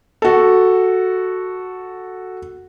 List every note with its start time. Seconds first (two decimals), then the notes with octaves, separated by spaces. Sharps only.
0.22 F#4 A4